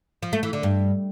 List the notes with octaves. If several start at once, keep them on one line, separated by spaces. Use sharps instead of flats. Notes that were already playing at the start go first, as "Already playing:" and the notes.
F3
A3
E3
D3
G2